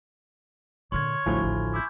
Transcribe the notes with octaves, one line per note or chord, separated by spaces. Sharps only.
A#2 D3 C#5 C6 F6 G#6
A1 D2 A2 F3 G3 G#5 B5 C#6
A1
E4 D6 G6